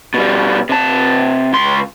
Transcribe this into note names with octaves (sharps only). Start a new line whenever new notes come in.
B2 G3
C3 A5
C#2 C6